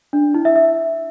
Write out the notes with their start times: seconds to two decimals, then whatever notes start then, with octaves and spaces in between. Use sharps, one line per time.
0.13 D4
0.34 E4
0.45 E5
0.56 E5